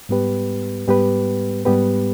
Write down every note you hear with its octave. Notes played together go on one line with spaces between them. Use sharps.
G#2 G3 B3 G4 B4
G#2 G3 B3 G4 B4
G#2 G3 B3 G4 B4